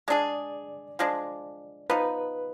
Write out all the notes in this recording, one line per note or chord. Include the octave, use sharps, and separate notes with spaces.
G#3 D4 G#4 D5
F3 G#3 D4
F3 B3 D#4 B4